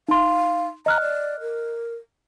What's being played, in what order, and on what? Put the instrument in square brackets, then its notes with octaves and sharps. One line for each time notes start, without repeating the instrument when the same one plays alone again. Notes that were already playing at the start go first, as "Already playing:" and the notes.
[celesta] D#4 C6 [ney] F5
[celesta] D#5 F6 F#6 [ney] A#5
[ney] D5
A#4